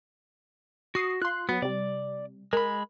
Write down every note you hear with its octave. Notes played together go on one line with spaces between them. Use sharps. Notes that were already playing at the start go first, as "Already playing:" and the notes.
F#4 D#6 C7
F4 C6 F#6
F#3 B3
C3 G3 D5
G#3 A#4 B5